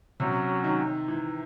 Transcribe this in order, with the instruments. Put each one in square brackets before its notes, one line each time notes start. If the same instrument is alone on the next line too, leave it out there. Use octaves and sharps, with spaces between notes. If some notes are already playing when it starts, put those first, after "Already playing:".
[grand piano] C3 [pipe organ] F#3 C#4 F#4
[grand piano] D#3
E3